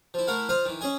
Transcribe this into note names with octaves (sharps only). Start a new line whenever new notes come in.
F3 E4
A3 E4 A#4 F5 F#5
F4 C5 D#5 F5
D#3 E3
C#4 G#4 D#5 G#5